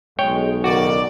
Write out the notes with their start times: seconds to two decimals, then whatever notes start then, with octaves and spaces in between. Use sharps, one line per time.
0.19 B1 G#3 C#5 G5
0.64 C#2 D#3 F#4 D5